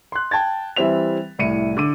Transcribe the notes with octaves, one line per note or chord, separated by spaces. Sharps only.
C6 F#6
G5 A5 G#6 A6
E3 G3 C4 E5 F7
C2 A2 C#7 D#7
D3 D6 D#7